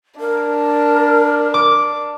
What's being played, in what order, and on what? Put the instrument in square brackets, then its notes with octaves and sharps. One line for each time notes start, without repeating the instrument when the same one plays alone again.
[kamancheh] D4 [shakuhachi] A#4
[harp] D6